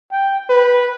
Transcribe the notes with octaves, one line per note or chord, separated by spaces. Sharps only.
G5
B4